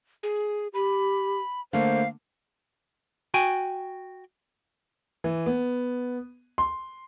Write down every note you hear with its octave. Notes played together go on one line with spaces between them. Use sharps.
G#4
G4 B5
D3 A3 A#3 C5 F5
F#4 G5 G#5
E3
B3
C6